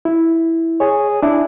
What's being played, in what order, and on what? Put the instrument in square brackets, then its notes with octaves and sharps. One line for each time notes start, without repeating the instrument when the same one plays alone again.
[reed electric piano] E4
[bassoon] G#4 [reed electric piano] C#5
[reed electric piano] D4 [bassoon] E4